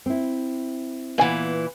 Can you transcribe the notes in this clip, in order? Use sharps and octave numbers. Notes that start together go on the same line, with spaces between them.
C4 E4
A#2 E3 B3 G#5